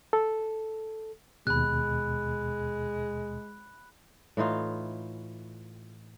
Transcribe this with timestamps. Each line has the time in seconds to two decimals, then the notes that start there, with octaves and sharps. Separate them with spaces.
0.13 A4
1.47 D#2 B2 G#3 B5 F#6
4.37 A2 E3 D#4 F4